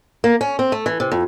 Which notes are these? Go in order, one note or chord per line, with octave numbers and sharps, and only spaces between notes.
A#3
C#4
C4
A3
E3
C3
F2